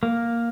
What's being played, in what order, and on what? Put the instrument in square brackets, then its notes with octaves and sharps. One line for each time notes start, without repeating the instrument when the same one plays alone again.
[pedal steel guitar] A#3